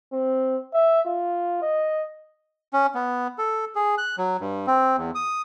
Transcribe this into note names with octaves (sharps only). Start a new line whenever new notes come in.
C4
E5
F4
D#5
C#4
B3
A4
G#4
F#6
F#3
G2
C4
E2
D#6